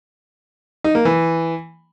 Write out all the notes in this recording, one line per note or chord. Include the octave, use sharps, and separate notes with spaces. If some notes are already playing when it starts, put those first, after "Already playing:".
D#4
A#3
E3